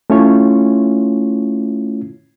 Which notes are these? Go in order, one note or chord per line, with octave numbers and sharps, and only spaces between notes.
A3 C#4 E4 F4 C#5